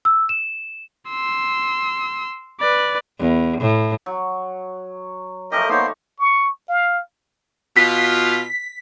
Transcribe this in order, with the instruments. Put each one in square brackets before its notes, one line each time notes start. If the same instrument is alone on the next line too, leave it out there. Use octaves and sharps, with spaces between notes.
[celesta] E6
E7
[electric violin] C6 E6
B4 D5
[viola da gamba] E2
A2
[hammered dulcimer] F#3
[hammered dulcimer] F3 A3 G4 [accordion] A#4 D#5
[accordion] A#3 B3 C5 [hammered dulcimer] D#4 C#5
[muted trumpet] C#6
F5
[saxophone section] B2 F4 [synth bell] B6